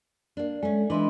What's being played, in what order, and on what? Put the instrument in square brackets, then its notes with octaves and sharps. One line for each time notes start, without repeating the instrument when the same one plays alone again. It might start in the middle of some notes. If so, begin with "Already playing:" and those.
[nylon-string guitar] A#3 D4
[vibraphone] G#3 [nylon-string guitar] A3 C#4
[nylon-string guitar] E3 E4 [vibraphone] D4 D#5 C6